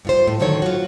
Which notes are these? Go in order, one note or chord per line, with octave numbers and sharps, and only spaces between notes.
G2 F4 C5
A2
D2 D3 D#3 F#3 C#5
F4 F#4